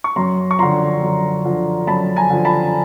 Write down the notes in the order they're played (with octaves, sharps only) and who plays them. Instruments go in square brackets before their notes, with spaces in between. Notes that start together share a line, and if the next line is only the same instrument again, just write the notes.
[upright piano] C#6
F#2 A#5 C6
C#6
D3 F3 A#5 C6
F#2
D3 F3
F#2 A5 B5
G#5 A#5
D3 F3
A5 B5